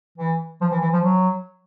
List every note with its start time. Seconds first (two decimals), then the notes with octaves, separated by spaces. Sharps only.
0.18 E3
0.61 F3
0.71 E3
0.82 E3
0.93 F3
1.03 F#3